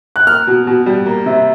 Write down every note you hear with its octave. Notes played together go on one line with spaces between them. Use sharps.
F#6
A#3 F6
B2
B2
G3
A#3
C3